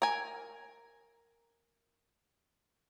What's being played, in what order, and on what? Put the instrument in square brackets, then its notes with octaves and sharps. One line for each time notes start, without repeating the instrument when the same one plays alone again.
[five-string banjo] A#4 G#5